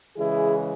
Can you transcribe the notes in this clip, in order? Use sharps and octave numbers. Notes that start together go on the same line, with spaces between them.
C#3 E3 G#3 E4 G#4